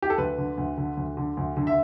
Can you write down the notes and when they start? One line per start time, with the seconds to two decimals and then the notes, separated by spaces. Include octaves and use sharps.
0.02 G4
0.10 A4
0.18 D2 B4
0.38 D3
0.57 D2
0.78 D3
0.97 D2
1.17 D3
1.37 D2
1.57 D3
1.67 E5